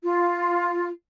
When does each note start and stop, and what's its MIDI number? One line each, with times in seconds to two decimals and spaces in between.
0.03 0.88 65